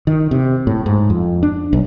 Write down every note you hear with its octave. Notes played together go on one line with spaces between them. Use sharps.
D#3
C3
A2
G#2
F2
D4
B1